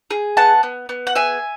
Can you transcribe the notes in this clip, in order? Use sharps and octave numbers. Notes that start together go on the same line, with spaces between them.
G#4
B3 F#5 A5
B3
B3
F#5
G#4 E5 G#5